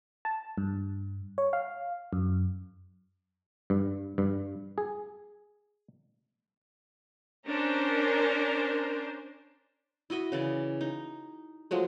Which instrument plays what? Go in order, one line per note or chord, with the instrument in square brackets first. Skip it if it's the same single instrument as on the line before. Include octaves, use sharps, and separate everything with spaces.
[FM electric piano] A5
G2
C#5
F5
F#2
[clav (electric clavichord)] G2
G2
G#4
[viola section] C#4 D4 A#4 C5
[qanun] E4 F#4 D#5 E5
C#3 E3 D5
D#4
F3 F#3 G#3 A3